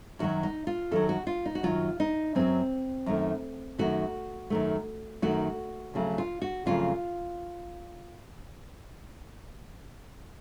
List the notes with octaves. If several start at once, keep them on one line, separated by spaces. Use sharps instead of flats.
F#2 D#3 F#3 F#4
D#4
F4
F#2 D#3 F#3 A4
F#4
F4
D#4
F#4
F#2 D#3 F#3 F4
D#4
F#2 D#3 F#3 C4
F#2 D#3 A3
F#2 D#3 A3 F#4
F#2 D#3 A3
F#2 D#3 A3 F#4
F2 C#3 F#3 A3
F4
F#4
F2 C#3 F#3 A3 F4